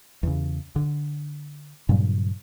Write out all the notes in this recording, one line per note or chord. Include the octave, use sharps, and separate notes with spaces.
E2 C#3
D3
G2 A#2 C#3 F#3